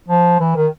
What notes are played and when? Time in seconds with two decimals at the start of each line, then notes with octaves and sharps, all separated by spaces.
0.08 F3
0.40 E3
0.56 D#3